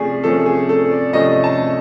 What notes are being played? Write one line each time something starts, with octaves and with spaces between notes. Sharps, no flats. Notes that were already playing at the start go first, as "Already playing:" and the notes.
Already playing: C3 F3 A3 C#4 G#4 D5
C3 F3 A3 C#4 A4
G#4
A4
D5
C3 F3 A3 C#4 D#5
A5